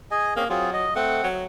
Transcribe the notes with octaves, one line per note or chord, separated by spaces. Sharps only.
G#4 D#5 G#5
A#3 C4 C#4 G#4
F#3 C4 F4 G#4
D#5
A3 C4 F#5
F#3